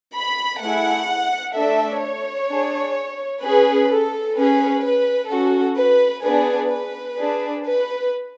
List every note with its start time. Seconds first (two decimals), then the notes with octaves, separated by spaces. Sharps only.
0.15 B5
0.61 A3 E4 G#4 F#5
1.55 A3 D4 A4 E5
2.01 C#5
2.49 D4 G#4
3.42 C#4 G#4 B4
3.89 A4
4.36 C#4 G#4 B4
4.82 B4
5.30 C#4 F#4 A4
5.76 B4
6.23 B3 D4 G#4 B4
6.71 B4
7.17 D4 G#4
7.64 B4